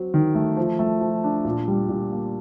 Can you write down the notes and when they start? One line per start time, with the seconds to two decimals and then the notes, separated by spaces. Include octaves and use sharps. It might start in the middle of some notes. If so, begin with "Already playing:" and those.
Already playing: F#3 C4
0.14 D#3
0.35 A3
0.57 F3
0.79 A3
1.01 F3
1.24 D4
1.45 A#2
1.68 G3
1.89 A#2
2.12 A#3